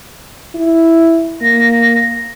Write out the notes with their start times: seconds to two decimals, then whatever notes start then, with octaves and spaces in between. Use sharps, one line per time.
0.55 E4
1.41 A#3 A#6